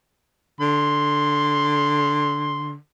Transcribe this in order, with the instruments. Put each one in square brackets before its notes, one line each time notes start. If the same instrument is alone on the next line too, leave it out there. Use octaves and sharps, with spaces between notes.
[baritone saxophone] D3 [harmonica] C6